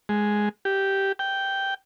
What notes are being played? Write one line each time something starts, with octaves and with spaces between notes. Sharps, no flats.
G#3
G4
G5